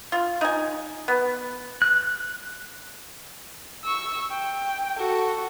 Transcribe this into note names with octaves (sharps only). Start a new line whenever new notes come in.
F4
D#4 G#5
B3
F#6
C#6 E6
G5
F#4 A4